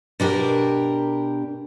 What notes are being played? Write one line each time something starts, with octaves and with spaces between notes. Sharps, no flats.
B2 D4 G4 A#4